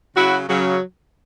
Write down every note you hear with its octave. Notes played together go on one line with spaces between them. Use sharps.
C#3 F#3 E4 F#4
C#3 F#3